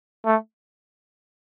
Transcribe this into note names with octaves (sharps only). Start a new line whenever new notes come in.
A3